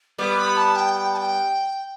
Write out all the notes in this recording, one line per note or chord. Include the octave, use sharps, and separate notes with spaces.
G3 B3 D6
B5
A5
G5
G5
A5
G5